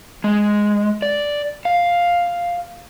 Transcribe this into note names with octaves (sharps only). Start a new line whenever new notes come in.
G#3
D5
F5